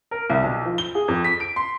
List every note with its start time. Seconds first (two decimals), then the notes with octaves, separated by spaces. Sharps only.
0.11 A#4
0.30 C2
0.43 B1
0.65 F3
0.78 G7
0.95 G#4
1.08 F2
1.24 B6
1.40 D7
1.56 C6